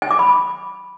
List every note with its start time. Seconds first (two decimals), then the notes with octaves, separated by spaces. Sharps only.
0.02 G#5
0.11 D6
0.19 B5